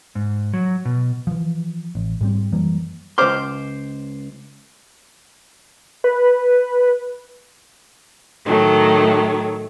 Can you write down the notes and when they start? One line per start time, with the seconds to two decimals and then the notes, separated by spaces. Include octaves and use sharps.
0.15 G#2
0.54 F#3
0.85 B2
1.27 E3 F3
1.95 A1
2.21 G#2 G3 C4
2.52 F#2 E3 G3 A#3
3.18 C#2 C5 C6 D6 F6
6.04 B4
8.45 A2 D#3 F#3 A3